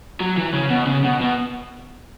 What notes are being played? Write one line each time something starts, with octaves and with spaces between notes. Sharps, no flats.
F#3
E3
C#3
B2
C#3
B2
B2